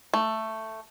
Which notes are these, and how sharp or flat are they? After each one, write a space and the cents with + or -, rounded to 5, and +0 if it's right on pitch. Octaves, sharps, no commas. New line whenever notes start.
A3 +5